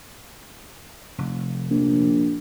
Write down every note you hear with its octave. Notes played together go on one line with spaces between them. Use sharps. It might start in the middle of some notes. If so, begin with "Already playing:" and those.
F1
A#1